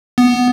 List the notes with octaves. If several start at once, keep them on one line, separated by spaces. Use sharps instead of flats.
B3